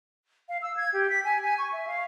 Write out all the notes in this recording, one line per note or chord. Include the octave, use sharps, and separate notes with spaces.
F5
E6
G#6
G4
B6
G#5
G#5
C#6
E5
F5